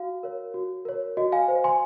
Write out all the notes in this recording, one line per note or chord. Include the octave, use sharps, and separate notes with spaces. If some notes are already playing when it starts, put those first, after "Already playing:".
Already playing: F#4 F5
A#4 C#5
F#4
A#4 C#5
F#4 D#5
F5 G#5
C5
G#5 C6